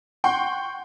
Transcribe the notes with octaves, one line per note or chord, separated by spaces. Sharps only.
F#5 G5 C6 C#6